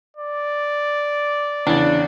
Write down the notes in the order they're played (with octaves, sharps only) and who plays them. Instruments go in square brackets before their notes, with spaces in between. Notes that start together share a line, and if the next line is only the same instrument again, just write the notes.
[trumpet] D5
[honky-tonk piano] E2 C#3 [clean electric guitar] D4